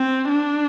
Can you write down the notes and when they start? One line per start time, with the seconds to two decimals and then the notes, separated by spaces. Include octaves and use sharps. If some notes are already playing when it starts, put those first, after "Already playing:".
Already playing: C4
0.29 D4